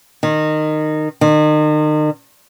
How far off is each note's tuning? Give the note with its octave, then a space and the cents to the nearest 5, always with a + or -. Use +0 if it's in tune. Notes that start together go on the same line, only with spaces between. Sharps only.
D#3 -15
D#3 -35